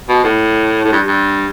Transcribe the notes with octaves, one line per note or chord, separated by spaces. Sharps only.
B2
A2
A2
G2
G2